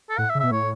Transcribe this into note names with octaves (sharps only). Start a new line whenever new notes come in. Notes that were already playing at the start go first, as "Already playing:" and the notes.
A4
A2 F#5
E5
C#3
B2 E5
A2 C#5